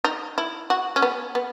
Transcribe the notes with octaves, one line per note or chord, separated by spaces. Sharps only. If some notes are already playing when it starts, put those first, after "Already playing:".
D#4
E4
F#4
C#4
B3
B3